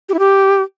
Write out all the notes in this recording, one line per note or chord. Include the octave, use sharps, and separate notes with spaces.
G4
E4
G4